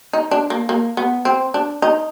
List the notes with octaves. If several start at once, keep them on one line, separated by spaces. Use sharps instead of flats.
D#4
D4
A#3
A#3
B3
C4
D4
D#4